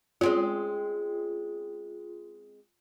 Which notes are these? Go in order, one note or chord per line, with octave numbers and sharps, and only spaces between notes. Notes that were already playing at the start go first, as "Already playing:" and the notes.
G#3 C4 C#4 F4